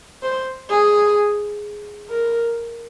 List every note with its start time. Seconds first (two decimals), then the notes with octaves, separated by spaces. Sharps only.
0.23 C5
0.70 G#4
2.09 A#4